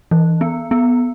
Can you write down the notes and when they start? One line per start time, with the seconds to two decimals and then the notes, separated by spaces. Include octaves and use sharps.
0.11 E3
0.41 B3
0.71 B3